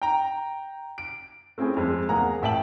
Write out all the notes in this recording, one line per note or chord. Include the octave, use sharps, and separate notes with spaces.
G5 A#5
D7
A3 C4 C#4 E4 G#4
F2 G#3
F1 E2 A#3 G#4 F#5 A#5
A1 E5 G5 A5 F#7